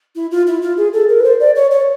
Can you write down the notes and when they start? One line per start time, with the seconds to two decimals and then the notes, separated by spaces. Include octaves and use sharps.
0.15 E4
0.31 F4
0.47 E4
0.62 F4
0.77 G#4
0.93 A4
1.08 A#4
1.20 B4
1.23 C5
1.40 D5
1.55 C#5
1.71 C#5